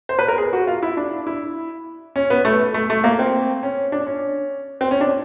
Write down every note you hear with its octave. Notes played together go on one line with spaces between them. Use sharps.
C5
B4
A#4
G#4
F#4
F4
E4
D4
E4
C#4
B3
A3
A3
A3
A#3
C4
C#4
D4
C#4
C4
C#4
D4